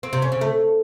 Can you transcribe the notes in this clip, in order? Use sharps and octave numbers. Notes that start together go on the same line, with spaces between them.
C4
C3
C#4
C#3
A3